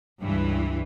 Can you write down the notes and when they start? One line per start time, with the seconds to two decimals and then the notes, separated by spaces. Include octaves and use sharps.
0.21 C#2 G2 E3